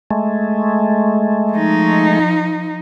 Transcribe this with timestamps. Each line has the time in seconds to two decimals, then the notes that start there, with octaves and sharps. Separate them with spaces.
0.10 G#3 A3
1.53 F3 D#4